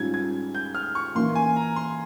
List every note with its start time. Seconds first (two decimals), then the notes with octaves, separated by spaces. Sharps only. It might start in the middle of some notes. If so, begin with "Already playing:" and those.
Already playing: G#2 G3 C#4 F4 G#6
0.14 G#6
0.55 G6
0.75 F6
0.95 C#6
1.15 E3 A#3 E4 C6
1.35 G#5
1.56 A#5
1.76 C6